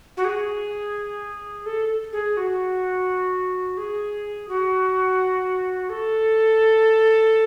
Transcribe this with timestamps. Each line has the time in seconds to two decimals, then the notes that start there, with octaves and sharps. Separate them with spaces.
0.17 F#4
0.25 G#4
1.66 A4
2.13 G#4
2.37 F#4
3.77 G#4
4.49 F#4
5.90 A4